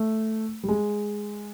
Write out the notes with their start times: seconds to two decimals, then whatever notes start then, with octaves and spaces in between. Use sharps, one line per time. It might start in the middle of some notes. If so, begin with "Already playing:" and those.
Already playing: A3
0.63 G3
0.69 G#3